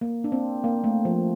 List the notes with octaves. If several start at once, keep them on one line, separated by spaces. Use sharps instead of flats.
A#3
D4
C4
A#3
A3
F3